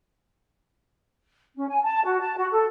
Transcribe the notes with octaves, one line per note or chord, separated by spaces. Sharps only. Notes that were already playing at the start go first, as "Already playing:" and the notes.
C#4
G#5
A5
F#4
A5
F#4
A4